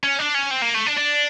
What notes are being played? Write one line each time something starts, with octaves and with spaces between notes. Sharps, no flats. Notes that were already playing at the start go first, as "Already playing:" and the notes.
C#4
D4
C#4
C4
A#3
A3
D4
D4